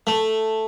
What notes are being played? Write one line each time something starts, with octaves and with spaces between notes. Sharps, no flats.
A3